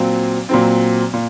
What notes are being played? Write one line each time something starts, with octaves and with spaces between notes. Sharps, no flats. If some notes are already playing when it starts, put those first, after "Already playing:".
Already playing: A#2 F#3 C4
A#2 F#3 C4
A#2